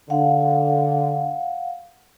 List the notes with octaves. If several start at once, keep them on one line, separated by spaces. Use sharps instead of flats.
D3 F5 F#5